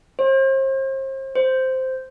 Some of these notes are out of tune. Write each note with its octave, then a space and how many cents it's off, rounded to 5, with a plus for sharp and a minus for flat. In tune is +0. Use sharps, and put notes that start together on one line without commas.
C5 +40
C5 -5